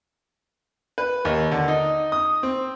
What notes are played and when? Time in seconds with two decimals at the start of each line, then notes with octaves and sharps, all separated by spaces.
0.98 B4
1.25 D#2
1.51 D3
1.68 D#4
2.12 D#6
2.43 C4